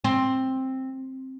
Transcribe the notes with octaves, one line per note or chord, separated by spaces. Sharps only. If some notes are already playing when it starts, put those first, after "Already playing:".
C4